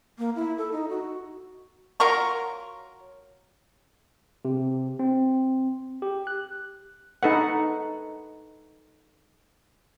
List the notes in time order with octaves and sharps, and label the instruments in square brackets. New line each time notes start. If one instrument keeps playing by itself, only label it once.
[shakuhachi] A#3
E4
A4
D#4
F#4
[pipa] F#3 F4 A#4 C#6
[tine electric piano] C3
C4
G4
F#6
[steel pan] D#4 A4 B4 F#5